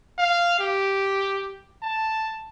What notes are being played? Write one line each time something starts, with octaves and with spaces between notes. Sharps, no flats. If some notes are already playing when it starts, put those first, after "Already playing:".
F5
G4
A5